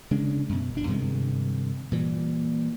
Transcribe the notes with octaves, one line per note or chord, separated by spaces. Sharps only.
C#3 G#3 D4
F#2 B2
G1 D4
G2 C3 D#3 G#3
A#2 E3 G3